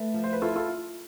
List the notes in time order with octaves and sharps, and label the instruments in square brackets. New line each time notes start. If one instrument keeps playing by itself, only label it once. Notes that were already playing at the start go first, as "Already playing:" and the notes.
Already playing: [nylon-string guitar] A3 [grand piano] B4
[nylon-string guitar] F3
[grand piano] C5
B4
[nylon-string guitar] E4 [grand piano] F4 A4
[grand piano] F4 A4